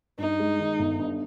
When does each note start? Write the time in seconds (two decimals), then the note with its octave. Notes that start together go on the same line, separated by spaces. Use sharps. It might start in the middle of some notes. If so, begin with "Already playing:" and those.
0.18 G2 D#4
0.39 G#3
0.59 D#3
0.79 G1
1.00 G2